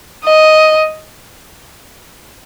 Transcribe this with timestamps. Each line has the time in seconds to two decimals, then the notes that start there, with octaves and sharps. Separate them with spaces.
0.25 D#5